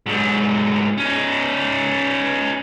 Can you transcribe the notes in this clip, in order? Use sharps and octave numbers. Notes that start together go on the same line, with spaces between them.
G#2 F#3
C#4 D#4